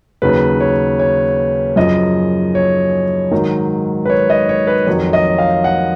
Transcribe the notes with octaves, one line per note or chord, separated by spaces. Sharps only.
D#2 C#3 F#3 B4
C#5
C#5
F#2 C#3 F3 D#5
C#5
G#2 D#3 F#3
B4
C#5
D#5
C#5
B4
F2 D#3 F#3 C#5
D#5
F5
F#5